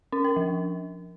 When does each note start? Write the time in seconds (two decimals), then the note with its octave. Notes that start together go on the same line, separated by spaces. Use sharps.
0.12 C#4
0.24 A#4
0.36 F3